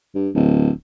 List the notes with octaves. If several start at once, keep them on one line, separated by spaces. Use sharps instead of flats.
G2
D1